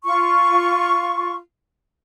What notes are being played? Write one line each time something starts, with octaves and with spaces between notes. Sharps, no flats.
F4 C#6